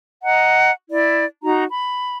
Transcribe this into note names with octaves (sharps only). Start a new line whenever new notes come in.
D#5 F#5 A#5
E4 D5
D#4 F#4 A#5
B5